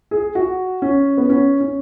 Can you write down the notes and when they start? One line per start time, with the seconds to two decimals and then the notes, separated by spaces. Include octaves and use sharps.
0.11 G#4
0.35 F#4
0.82 C#4
1.17 B3
1.29 C#4
1.61 C#4